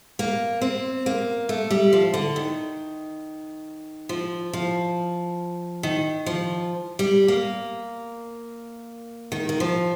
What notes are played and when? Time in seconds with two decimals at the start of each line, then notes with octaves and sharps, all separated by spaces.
0.19 A#3
0.61 C4
1.06 A#3
1.49 A3
1.71 G3
1.93 F3
2.14 D3
2.36 D#3
4.09 F3
4.53 F3
5.83 D#3
6.26 F3
6.99 G3
7.28 A#3
9.32 D#3
9.49 D#3
9.60 F3